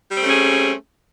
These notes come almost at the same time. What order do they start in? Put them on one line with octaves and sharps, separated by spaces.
G3 C4 A3 C#4 G#4